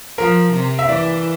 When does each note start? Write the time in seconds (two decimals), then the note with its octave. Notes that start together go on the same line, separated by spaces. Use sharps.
0.18 F3 A#4
0.53 C3
0.79 E5
0.89 E3 D5